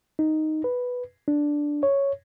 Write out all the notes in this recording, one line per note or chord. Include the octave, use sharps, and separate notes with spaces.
D#4
B4
D4
C#5